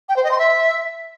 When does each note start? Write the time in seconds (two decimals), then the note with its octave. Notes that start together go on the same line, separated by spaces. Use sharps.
0.08 G5
0.16 C5
0.23 D#5
0.31 C6
0.38 E5